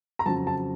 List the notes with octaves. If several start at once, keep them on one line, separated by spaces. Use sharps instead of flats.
A#5
F2 C#3 F#3 A5
A5